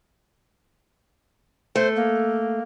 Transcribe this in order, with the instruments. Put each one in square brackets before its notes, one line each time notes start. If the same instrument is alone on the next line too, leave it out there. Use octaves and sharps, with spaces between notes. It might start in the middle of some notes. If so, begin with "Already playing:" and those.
[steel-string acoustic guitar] A3 [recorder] C5
[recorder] A#3